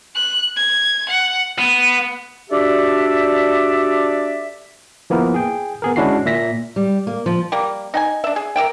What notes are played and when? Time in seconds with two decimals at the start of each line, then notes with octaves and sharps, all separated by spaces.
0.15 F#6
0.56 G#6
1.10 F#5
1.59 B3
2.50 D4 F#4 G4 A4 D5 E5
5.10 F3 A#3 B3 E4 A#4
5.34 G#4 G5
5.82 B3 G#4 A#4
5.96 G#3 C#4 D4 E4 F#4 C7
6.26 A#2 E5 A#6 B6
6.76 G3
7.07 A#3
7.26 F3
7.52 G3 A#3
7.94 D#4 G5 G#5
8.24 D4 E5
8.36 G#4
8.56 A#4 D5 E5 G5